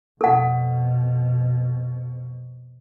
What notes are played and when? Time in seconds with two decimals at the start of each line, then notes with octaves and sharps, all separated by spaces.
0.21 F2 B2 A4 F#5